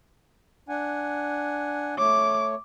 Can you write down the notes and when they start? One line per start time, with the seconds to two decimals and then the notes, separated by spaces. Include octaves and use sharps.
0.69 D4 F#5 G#5
1.98 A3 C#5 D6